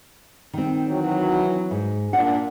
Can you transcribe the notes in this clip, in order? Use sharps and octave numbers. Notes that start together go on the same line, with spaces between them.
D#3 C4
E3 F#3
G#2
A#2 D4 F#5